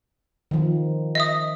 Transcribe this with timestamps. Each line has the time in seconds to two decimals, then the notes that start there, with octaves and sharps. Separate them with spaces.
0.51 D#3 F3
1.15 D#5 E5 D#6